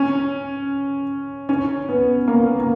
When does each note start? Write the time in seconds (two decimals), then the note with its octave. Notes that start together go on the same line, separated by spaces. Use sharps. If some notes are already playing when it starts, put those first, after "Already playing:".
Already playing: C#4
1.49 C#4
1.89 B3
2.28 A#3
2.60 A#3